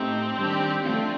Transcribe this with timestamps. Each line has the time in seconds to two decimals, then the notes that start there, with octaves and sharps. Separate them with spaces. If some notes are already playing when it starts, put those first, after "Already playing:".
Already playing: A2 A3 C4 D#4 G4
0.36 D#3 G3 D4 G4
0.85 D3 F3 A3 C4 D4 F4